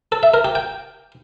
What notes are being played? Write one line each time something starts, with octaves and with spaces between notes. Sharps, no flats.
A4
E5
A#4
G4
G5